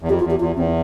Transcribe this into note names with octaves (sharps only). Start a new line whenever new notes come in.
E2
F2 G4
F4
E2
G4
E2 F4
E2 C4